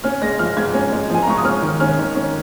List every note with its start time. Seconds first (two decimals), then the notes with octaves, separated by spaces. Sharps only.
0.04 C#4 F6
0.22 G#3 A#6
0.39 F3 F6
0.57 G#2 G#6
0.74 C#4
0.92 G#3
1.10 F3 G#5
1.22 A#5
1.28 G#2 C#6
1.38 D#6
1.45 C#4 F6
1.62 D#3
1.80 C#4 F6
1.99 D#3
2.16 C#4